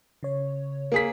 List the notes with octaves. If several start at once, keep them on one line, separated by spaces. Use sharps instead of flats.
C#3 C#5
A#3 G#4 B6